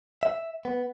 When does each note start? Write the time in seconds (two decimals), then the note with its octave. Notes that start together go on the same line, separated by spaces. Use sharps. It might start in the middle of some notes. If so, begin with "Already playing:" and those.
0.23 E5
0.65 B3